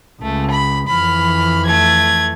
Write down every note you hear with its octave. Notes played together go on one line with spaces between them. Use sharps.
C#2 A3
B5
F2 E3 B5 F6
A3 G#6